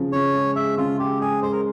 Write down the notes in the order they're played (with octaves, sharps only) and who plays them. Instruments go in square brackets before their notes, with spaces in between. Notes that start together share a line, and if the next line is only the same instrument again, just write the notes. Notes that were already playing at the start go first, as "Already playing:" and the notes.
Already playing: [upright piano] C#3 F3
[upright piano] C#3 [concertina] C#5
[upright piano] G#3
[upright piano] G#3 [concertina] E5
[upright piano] C#3 [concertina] F4
[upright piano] G#3 [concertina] G4
[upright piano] G#3 [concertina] G#4
[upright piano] G#3 [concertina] C5
[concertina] A#4